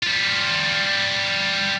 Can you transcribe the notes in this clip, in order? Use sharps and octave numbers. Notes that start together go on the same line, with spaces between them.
G3 F4